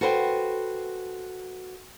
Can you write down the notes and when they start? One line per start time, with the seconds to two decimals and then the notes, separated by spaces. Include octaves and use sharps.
0.01 F#4 A4 B4 C5 F5 G5